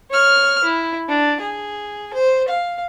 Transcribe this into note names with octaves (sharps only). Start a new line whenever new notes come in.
C#5 F6
E4
D4
G#4
C5
F5